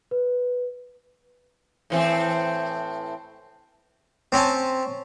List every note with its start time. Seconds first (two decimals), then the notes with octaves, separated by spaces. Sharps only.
0.11 B4
1.90 A2 E3 C4
4.32 C4 C#4 G#5 A5